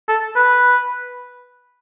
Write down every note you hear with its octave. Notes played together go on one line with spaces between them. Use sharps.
A4
B4